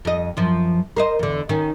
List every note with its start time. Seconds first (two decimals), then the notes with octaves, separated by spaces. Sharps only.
0.05 F2 D#5
0.37 F#2 F3
0.97 A#4 C5 D#5
1.19 E2 D3
1.49 D#3 C#4